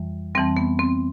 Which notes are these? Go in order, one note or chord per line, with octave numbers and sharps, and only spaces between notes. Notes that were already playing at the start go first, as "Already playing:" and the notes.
Already playing: F2 E3 G3
F2 E3 G3 C4
B3
C4